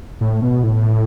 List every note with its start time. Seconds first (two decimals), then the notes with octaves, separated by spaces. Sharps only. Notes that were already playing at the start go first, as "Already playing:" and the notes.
0.21 A2
0.42 B2
0.63 A2